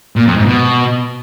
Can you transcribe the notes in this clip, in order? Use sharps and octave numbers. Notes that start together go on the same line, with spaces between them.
A#2
F2
G#2
B2